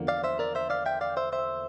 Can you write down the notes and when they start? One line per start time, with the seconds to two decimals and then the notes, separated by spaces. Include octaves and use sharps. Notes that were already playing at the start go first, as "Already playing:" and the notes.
Already playing: E2 D3 F3 A#3
0.08 D5 F5
0.24 C5 E5
0.39 A#4 D5
0.55 C5 E5
0.70 D5 F5
0.86 E5 G5
1.01 D5 F5
1.17 C5 E5
1.33 C5 E5